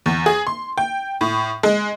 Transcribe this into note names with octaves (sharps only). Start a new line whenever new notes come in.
E2
G#4
C6
G5
A2
G#3